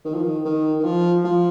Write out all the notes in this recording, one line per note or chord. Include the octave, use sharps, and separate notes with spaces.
D#3
F3
D#3
D#3
D#3
F3
F3